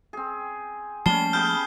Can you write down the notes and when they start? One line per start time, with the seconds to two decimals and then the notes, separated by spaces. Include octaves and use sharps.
0.13 C4 G#4
1.06 F3 G3 A3 A#3 C#4 A5 C7 G7
1.33 B3 G4 G#4 F6 G6